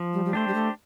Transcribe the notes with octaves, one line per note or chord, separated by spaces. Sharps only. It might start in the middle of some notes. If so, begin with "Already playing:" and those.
Already playing: F3
G3
G3
A3 D4 G4 C5
G3
A3